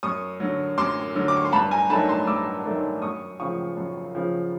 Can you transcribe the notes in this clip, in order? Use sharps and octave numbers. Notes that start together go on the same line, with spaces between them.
F#2 C#6 D#6
D3 F#3
F#2 C6 D6
D3 F#3
D6
C#6
C6
G2 A5 B5
G#5 A#5
D#3 F#3 A3 D4 A5 B5
A#5 C6
G2 D6 E6
D#3 F#3 A3 D4
F#2 C#6 D#6
C#3 F3 C#6 D#6
F#2
C#3 F3